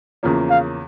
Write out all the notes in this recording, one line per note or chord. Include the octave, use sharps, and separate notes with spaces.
E2 C#3 F3 A#3 C#4
F5